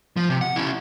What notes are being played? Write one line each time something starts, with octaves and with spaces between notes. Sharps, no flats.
F3
C3
F#5
C#4 E4